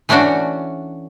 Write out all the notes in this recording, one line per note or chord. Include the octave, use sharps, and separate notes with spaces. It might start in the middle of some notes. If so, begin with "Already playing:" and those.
E3 A3 C#4 D4 F#4